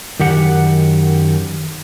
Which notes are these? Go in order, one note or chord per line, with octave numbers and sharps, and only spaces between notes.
F#2 D#3 G4 F#5